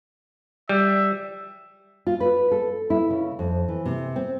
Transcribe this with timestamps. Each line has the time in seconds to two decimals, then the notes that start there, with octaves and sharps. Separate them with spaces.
0.69 G3 E5
2.07 F4
2.20 B4
2.51 A4
2.90 E4
3.10 C#3
3.39 F2
3.68 E3
3.85 C3
4.16 C4